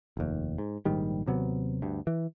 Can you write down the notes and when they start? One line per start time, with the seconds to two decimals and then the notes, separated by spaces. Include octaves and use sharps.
0.17 F1 D#2
0.58 G#2
0.85 A#1 G#2 D#3 G3
1.26 D#2 C3 F#3 B3
1.82 D2 G2
2.07 E3